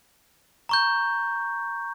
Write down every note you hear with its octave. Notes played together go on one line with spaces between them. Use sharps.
A#5 C#6 G6